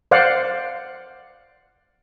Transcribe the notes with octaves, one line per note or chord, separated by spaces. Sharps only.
C5 D5 F5 F#5